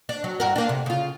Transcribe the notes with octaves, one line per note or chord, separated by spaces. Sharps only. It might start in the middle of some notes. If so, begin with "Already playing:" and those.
D4
F#3
G2 F#4 A#4
A#3 D4
C3
C#3 F4